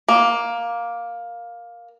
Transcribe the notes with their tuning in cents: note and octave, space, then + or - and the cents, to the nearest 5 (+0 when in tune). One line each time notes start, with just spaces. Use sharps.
A#3 +10